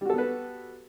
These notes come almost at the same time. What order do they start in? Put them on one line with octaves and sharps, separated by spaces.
G3 F#4 A4 B3 B4